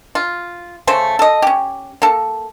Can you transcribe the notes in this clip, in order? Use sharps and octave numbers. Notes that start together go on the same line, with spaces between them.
F4
C#3 A3 C5
A4 D#5
C#4 G4
A#3 A4